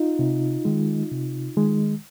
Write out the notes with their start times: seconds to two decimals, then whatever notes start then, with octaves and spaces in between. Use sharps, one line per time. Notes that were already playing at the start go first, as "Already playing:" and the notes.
Already playing: D#4 F4
0.19 C3
0.65 D#3 G#3
1.11 C3
1.57 D#3 G#3